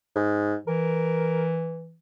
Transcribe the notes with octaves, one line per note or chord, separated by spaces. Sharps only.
G#2
E3 A#4